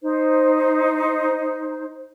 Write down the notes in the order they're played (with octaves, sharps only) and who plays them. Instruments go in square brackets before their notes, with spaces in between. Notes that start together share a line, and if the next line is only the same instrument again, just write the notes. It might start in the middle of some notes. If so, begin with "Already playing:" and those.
[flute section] D#4 C5